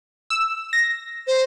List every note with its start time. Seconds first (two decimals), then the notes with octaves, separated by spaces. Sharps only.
0.30 E6
0.73 A#6
1.27 C5